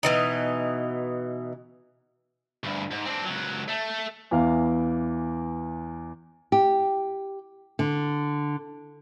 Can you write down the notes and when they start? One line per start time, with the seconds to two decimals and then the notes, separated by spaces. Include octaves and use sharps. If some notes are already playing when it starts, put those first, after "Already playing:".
0.03 B2 E3 D#4
2.64 D2 G2
2.91 G#2
3.05 C4 D4
3.25 C#2 F#3
3.68 A3
4.31 E2 E3 F5
6.52 G4
7.79 D3